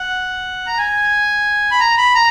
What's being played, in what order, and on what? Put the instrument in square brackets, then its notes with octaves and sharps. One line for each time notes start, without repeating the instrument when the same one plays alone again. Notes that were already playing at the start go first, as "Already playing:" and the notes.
Already playing: [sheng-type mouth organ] F#5
A#5
G#5
B5
A#5
B5
A#5